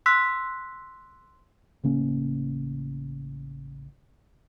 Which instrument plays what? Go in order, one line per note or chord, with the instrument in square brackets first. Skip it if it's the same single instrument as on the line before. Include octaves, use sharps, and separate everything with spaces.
[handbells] C6 E6 F#6 B6
[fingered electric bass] A1 C#3 A#3 C#4